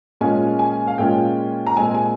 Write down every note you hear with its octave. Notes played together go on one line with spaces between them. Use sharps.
A#2 G#3 C#4 F4 G#5
G#5
F5
A#2 G#3 C#4 F4 G5
A#5
A#2 G#3 C4 G#5
G#5